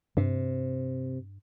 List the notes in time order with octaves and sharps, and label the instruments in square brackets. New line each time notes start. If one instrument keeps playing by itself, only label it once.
[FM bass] G2 [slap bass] C3